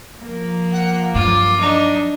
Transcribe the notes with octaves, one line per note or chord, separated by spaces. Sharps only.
F3 A#3
F#5
G2 F#3 F4 D6
D4 D#4